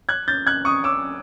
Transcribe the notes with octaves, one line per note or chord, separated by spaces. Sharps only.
F#6 G#6
G6 A6
F#6 G#6
C#6 D#6
D6 E6